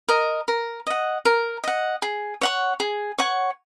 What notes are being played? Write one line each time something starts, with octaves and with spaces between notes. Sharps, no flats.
A#4 D#5
A#4
D#5 F#5
A#4
D#5 F#5
G#4
C#5 F#5 C#6
G#4
C#5 F#5 C#6